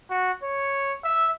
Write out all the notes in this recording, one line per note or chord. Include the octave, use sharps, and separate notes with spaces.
F#4
C#5
E5